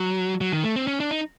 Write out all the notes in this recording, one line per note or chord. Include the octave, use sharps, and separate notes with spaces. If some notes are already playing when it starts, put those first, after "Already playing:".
Already playing: F#3
F#3
D#3
A3
C4
C#4
D4
D#4